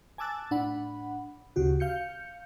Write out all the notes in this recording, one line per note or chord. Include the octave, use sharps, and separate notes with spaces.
G#5 A5 D6 E6 F#6 A6
A2 D4 F#5 B5
D2 C#3 F#4 G4
F5 G6 C#7